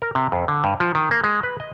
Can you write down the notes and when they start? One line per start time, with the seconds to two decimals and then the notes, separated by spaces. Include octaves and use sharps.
0.02 A#4
0.15 C3
0.32 F2
0.48 D3
0.64 G2
0.80 F3
0.95 D#3
1.11 A#3
1.24 G#3
1.43 B4
1.60 D#5